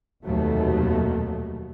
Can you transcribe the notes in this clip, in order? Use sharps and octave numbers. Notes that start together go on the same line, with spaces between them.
F1 D#2 B2 F#3 A3